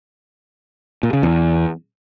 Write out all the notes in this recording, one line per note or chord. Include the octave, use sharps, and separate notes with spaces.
A#2
C#3
E2